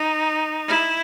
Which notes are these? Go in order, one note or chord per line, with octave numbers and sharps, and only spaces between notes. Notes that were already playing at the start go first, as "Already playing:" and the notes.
Already playing: D#4
E4